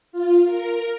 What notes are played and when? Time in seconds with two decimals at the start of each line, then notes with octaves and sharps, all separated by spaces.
0.12 F4
0.45 A#4